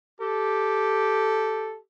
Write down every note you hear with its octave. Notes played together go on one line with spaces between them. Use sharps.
G4 A4